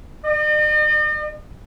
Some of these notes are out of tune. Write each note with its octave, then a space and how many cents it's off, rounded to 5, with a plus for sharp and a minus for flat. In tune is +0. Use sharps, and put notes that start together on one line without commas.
D#5 -45